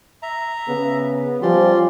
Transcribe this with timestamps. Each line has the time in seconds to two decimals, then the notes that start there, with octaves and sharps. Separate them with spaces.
0.22 E5 A#5
0.68 C#3 B3
1.42 F3 G3 C#4 G4 D5 C6